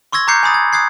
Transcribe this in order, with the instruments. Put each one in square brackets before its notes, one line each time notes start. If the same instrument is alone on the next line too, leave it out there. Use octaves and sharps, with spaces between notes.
[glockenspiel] C6 C#6 E6 G#6 A#6
A#5 D6 F#6 G6 C7 C#7
G#5 B5 D#6 A6
G#6
D#6 F#6 G#6 C7